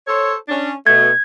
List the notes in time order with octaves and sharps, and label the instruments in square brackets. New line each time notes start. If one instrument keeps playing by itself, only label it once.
[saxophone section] A4 C5 C#5
C#4 D4
[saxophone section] B2 A3 [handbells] G#6